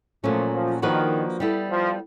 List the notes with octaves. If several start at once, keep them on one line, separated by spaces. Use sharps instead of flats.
A#2 F3 F#3 A3 C#4
F3
D#3 F3 A#3 D4 F#4 B4
G3 B3 E4 A4
F3